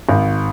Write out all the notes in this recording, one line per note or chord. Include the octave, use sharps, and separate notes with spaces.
G#1